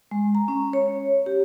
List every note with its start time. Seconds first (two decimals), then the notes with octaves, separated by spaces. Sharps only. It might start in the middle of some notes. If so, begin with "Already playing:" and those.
0.11 G#3
0.35 A#5
0.48 C#4
0.73 C#5
1.26 G4